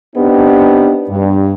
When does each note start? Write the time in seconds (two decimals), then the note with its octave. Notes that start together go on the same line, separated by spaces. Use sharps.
0.16 B3 C4 D4 D#4 G4
1.10 G2